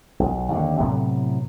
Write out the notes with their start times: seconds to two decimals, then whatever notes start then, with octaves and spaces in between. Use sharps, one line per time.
0.20 B1
0.53 D#2 D3
0.80 A2 C3 F#3 B3